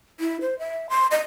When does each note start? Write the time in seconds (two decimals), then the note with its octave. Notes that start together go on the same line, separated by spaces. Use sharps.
0.20 E4
0.41 C5
0.59 E5
0.90 C6
1.11 D#5